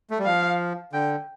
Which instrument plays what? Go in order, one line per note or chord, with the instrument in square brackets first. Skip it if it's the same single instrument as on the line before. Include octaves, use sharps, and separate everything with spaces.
[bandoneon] A3
G3
[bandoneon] F3 [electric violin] F5
[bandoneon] D3 [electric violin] G5